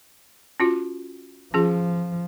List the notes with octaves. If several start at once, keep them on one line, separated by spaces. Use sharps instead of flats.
C#4 F4 F#4
F3 C#4 F4 G#4